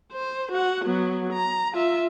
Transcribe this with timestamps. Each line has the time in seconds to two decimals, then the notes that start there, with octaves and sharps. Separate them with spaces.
0.12 C5
0.52 F#4 F#5
0.85 F#3 B3
1.33 A#5
1.73 F4 E5